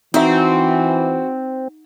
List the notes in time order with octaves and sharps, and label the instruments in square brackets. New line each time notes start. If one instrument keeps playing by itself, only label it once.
[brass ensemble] E3 [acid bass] C4 [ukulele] D#4 E5 [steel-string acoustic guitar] F#4